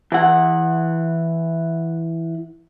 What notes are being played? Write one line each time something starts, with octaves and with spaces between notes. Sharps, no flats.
E3 F#5